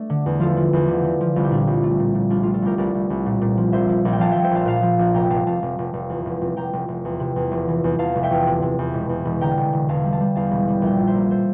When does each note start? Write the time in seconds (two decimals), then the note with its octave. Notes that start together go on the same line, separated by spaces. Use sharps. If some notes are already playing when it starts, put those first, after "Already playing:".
Already playing: A3 D4
0.10 D3
0.26 E2
0.39 F3 F4 A4
0.57 F3
0.73 E2
0.88 D3
1.04 D3
1.21 F3
1.36 C2 F4
1.44 G4
1.50 A#2 D4 F4
1.67 C2
1.84 A3
1.99 A#2
2.15 A#2
2.30 C2 D4 F4
2.42 A3 F4 A4
2.54 F4 A4
2.62 C2 G4 A#4
2.78 C2 A#4 D5
2.94 C2
3.10 C2
3.26 A#2
3.42 A#2
3.57 F3
3.72 A#1 C5 E5
3.89 F3
4.05 A#1
4.13 G5
4.19 F3 F5 A5
4.31 F3 E5 G5
4.43 C5 E5
4.51 A#1 F5 A5
4.65 A#2 F5 A5
4.83 F3
4.99 A#1
5.14 F1 G5 A#5
5.30 F1 F5 A5
5.47 F1 F5 A5
5.62 F1
5.79 F1
5.93 F1
6.10 E2
6.25 F1
6.41 F1
6.57 F1 G5 A#5
6.73 F1
6.88 F1
7.05 E2
7.20 C3
7.36 E2
7.51 F1
7.68 E3
7.84 E2
7.99 E2 F5 A5
8.15 F1
8.23 E5 G5
8.31 E2
8.47 C3
8.62 C3
8.79 E2
8.94 E1
9.09 E2
9.25 E1
9.41 D3 G5 A#5
9.57 E1
9.73 E1
9.89 E2 F5 A5
10.05 G3
10.12 F5 A5
10.21 G3
10.35 E2 F5 A5
10.51 E1
10.68 G3
10.82 A#1 E5 G5
10.99 A#2
11.07 C5 E5
11.15 A#3
11.31 A4 C5